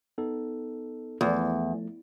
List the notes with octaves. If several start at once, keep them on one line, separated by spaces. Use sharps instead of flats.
B3 D#4 A4
E2 F3 A3